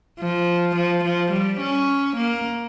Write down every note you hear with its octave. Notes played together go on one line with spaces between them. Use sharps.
F3
F3
F3
G3
C#4
A#3